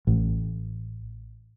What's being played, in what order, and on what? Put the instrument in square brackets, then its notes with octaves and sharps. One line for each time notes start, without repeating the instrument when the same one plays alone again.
[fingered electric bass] A1